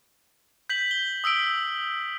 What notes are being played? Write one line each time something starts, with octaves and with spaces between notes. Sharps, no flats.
G6 B6 F#7
G7
D#6 E6 B6 D7